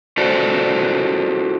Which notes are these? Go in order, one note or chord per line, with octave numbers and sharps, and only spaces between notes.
F4 F#4 A4 C5 D5